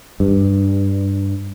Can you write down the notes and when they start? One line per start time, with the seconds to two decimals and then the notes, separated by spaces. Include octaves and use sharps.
0.20 G2